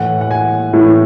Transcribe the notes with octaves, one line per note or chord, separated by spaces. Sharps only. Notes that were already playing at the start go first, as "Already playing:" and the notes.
Already playing: A2 E3 F#5
F#5
G#5
A2 E3